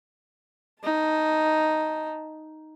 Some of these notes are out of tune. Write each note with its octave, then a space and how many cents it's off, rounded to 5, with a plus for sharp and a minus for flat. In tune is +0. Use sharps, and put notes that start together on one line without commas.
D#4 +0 A5 +0